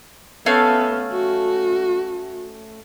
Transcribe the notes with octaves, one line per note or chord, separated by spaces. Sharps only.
A3 B3 C#4 F5
F#4